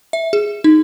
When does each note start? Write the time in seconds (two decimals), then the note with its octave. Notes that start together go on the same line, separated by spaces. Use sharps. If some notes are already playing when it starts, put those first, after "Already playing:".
0.13 E5
0.33 G#4
0.64 D#4